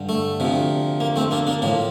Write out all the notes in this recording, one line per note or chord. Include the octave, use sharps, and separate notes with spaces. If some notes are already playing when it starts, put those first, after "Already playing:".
Already playing: G2 D3 G3
A3
D2 C3 F3
A#3
A3 C4
A#3 D4
A#3 D4
A2 F3 A#3